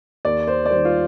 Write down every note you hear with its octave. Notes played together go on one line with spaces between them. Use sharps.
D#2 D5
C5
D5
D#3 G3 C5
F4